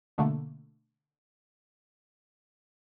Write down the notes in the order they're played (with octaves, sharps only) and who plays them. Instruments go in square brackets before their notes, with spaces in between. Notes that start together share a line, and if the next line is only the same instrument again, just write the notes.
[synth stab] B2 D3 A3 A#3